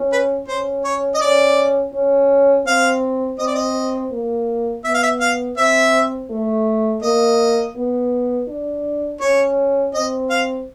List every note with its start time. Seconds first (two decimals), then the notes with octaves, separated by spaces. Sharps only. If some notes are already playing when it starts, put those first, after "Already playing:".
Already playing: C#4
0.12 B4
0.48 C#4 C5
0.84 C#5
1.14 D#5
1.21 C#4 D5
1.94 C#4
2.66 C4 F5
3.39 C4 D#5
3.47 D5
3.55 D#5
4.12 A#3
4.84 B3 E5
4.94 F5
5.03 E5
5.20 F5
5.57 C4 E5
6.31 A3
7.02 A#3 D#5
7.76 B3
8.48 D4
9.20 C#4 C#5
9.94 C4 D#5
10.30 F5